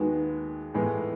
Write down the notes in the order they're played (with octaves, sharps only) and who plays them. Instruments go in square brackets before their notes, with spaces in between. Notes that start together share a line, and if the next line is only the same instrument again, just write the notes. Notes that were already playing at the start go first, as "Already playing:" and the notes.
Already playing: [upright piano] D#2 D#3 G#3 B3 F#4
A2 E3 G#3 B3